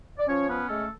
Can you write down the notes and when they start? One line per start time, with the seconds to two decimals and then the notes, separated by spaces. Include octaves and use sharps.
0.19 D5
0.27 F3 C#4 C#5
0.48 B3 C#4 B4
0.69 G#3 A3 A4